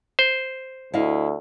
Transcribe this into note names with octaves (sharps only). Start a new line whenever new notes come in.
C5
D2 E4 D#5 F5